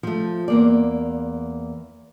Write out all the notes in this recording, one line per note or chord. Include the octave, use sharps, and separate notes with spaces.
F3 A3
E2 A#3 D5